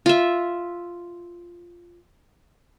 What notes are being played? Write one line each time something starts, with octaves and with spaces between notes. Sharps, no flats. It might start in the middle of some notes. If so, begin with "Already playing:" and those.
F4 E5